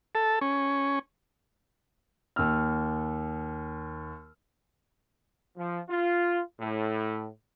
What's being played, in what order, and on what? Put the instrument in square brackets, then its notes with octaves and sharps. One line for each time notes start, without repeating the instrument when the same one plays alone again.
[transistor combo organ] A4
C#4
[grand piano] D#2 E6 F6
[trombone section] F3
F4
A2